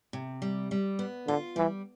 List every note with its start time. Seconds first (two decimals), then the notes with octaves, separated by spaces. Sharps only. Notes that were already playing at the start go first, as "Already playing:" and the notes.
0.13 C3
0.42 G3
0.71 G3
0.99 B3
1.27 D3 F4
1.56 E3 G3